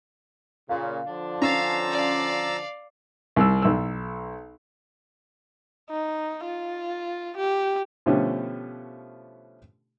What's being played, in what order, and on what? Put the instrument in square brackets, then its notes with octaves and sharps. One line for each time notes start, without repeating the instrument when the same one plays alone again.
[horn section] A#2 C#3 [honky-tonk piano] F5
[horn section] D3 F3 D4
[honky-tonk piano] C#4 [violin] F5 [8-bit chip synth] A#5 E6 A6
[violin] D5 F5
[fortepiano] C2 E6
B1 E6
[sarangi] D#4
F4
G4
[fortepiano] B2 D3 F3 A3 C#4 G4